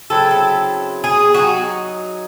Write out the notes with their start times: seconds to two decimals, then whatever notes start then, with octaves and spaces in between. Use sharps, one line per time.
0.10 C#3 F#3 C4 E4 A4
0.31 A4
1.04 G#4
1.34 F#3 C4 F#4
1.39 D#4